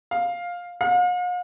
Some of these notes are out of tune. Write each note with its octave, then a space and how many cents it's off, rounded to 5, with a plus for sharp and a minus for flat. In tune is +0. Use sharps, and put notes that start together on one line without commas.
F5 +10
F5 +45